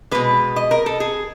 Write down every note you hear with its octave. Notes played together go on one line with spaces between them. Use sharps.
B2 G#3 B4
D#5
A#4
A4
G#4